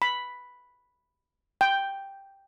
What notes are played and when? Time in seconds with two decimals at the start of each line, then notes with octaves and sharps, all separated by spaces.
0.02 B5
1.61 G5